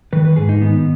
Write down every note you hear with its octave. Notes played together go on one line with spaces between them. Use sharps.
D#3 B4
B4
G#2 G#4
D#4
D#3 B3